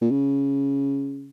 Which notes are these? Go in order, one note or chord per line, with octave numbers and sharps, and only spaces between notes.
A#2
C#3